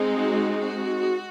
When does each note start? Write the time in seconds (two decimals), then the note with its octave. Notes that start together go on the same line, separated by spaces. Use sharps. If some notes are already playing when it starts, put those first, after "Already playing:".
Already playing: G#3 C4 D#4
0.14 F#4
0.59 F#4